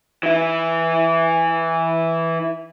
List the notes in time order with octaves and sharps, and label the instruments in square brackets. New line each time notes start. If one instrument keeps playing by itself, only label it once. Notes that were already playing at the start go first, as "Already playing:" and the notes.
[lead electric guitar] E3 E4